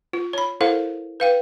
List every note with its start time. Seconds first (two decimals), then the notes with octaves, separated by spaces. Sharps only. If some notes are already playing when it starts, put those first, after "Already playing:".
0.13 F4
0.33 C#5 B5
0.61 E4 A4 A#4 C5 F5 F#5
1.20 B4 F5 G5